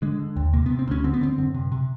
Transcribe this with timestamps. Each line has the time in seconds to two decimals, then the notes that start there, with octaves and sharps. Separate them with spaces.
0.02 D3 G#3
0.19 D3
0.36 D#2
0.53 C3 A#3
0.66 B3
0.70 C3
0.79 C4
0.88 D2 C#4
1.04 D3 C4
1.14 B3
1.21 D3 C4
1.38 F#2
1.54 C3
1.72 C3